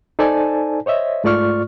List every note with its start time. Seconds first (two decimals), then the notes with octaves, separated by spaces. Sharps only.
0.19 D#4 A4 C5 D5 G#5 A5
0.86 C5 C#5 D#5 E5
1.24 G#2 A3 F4 D5 C#6 F6